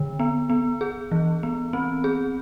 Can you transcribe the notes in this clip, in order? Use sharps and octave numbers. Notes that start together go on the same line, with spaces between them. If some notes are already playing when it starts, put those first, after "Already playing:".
Already playing: D3
B3
B3
G#4
E3
B3
C4
G#4